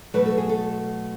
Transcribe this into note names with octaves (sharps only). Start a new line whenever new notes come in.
B2 F#3 A3 B4
A4
G#4
A4